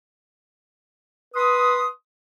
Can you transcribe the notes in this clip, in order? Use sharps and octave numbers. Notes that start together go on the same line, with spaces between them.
B4 C6 D#6